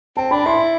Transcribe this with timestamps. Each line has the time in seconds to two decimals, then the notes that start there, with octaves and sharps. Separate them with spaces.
0.17 C4 A5
0.31 D4 B5
0.46 E4 C6